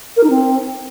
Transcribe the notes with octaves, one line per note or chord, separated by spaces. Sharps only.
A#4
D#4
C4